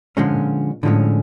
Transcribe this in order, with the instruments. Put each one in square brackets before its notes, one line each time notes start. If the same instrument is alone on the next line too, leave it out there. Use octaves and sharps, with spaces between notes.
[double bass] A#2 [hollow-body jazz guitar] D3 F3 G#3 C#4
[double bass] A2 [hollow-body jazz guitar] D3 F3 G#3 C#4